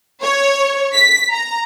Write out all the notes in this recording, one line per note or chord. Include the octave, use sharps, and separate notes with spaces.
C#5
B6
A#5